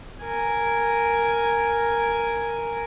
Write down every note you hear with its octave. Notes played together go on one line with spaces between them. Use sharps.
A#4 G#5